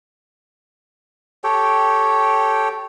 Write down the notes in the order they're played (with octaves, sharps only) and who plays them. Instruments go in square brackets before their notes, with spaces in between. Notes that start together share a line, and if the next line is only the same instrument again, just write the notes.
[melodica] G4 A4 C#5 G5